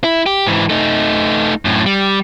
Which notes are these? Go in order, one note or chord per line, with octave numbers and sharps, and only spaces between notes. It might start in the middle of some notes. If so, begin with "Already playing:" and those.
E4
G4
G#2 E3
A3 D#4
F#2 A2
G3